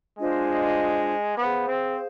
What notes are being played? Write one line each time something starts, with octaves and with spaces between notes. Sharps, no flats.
G#3 D4 F4 C5 D#5
B3 G#4 C5 F5
C4